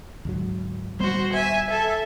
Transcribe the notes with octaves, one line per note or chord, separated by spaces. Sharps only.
D2 G#2 F#3
D#1 G3 B3 F#4 C5
E5 G#5
A4 E5